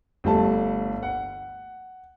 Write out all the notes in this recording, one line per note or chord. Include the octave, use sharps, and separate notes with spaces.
G1 G3 A3 A5
F#5